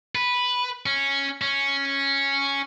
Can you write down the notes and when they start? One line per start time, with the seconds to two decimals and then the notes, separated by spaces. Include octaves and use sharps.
0.15 B4
0.86 C#4
1.42 C#4